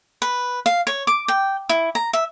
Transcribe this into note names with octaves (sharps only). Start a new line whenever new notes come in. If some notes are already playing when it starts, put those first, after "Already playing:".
B4
F5
C#5
D6
G5
E4
A#5
E5